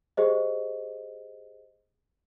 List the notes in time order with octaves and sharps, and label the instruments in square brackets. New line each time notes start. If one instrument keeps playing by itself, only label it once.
[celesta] G4 G#4 C5 D#5